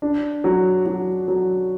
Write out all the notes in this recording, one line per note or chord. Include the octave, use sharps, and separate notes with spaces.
D4
F#3
F#3
F#3